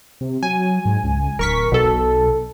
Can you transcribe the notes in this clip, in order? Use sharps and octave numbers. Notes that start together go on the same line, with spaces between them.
C3
F#3 G#5
G#2
C#2
D1 A#4 C#6 B6
B1 B2 A4